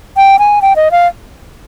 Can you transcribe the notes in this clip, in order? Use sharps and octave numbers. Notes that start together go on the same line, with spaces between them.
G5
G#5
G5
D#5
F5